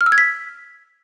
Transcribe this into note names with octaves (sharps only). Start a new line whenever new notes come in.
F6
E6
G#6
B6